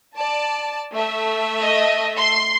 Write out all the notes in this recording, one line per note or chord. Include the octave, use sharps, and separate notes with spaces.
D5 A5
A3 E5
D#5
C6 C7